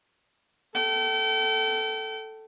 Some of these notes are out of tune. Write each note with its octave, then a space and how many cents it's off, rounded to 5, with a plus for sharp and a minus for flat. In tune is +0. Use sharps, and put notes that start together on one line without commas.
A4 +0 G5 -35